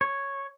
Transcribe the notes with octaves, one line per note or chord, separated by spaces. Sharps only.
C#5